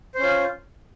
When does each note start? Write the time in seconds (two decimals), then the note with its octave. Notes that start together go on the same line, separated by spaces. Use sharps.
0.15 C5
0.19 C#4
0.23 F4